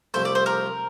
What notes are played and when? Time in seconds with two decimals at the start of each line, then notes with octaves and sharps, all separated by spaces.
0.14 C2 C3 F3 A3 C5
0.25 D5
0.35 C5
0.46 A#4